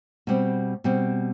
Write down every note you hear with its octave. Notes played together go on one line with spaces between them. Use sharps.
B2 G3 C4
B2 G3 C4